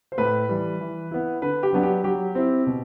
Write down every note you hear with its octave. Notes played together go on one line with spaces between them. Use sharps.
C5
A2 B4
E3 G3
E3
B3 E4
D3 B4
G4
F#3 B3 D4
G4
F#3 G4
C4 E4
B2